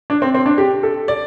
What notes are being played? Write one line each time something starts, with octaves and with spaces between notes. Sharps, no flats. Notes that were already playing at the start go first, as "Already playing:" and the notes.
D4
C4
C4
D4
G4
A4
D5